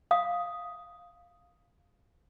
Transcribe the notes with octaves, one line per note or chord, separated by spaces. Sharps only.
F5 D#6